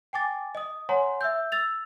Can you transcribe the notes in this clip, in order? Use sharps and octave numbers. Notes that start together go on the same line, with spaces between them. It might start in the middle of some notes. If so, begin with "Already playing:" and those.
G5 G#5 D6 A6
D#5 D#6
C#5 F#5 G#5 A#5 C6
E5 E6 G6
E6 A6 F7